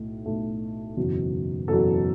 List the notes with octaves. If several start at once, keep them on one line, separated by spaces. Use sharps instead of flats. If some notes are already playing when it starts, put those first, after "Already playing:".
Already playing: B1 A2 A3
B1 A2 A3
F#1 E2 B2 F#3
F#1 E2 B2 F#3 A4